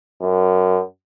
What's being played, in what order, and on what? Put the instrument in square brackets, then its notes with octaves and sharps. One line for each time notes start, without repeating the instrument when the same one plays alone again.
[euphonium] F#2